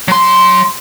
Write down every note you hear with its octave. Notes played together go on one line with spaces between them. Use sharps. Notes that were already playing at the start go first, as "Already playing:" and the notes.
F#3 C6